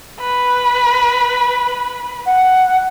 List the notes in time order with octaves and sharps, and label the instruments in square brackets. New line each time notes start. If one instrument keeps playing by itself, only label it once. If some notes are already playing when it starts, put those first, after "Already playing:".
[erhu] B4
[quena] F#5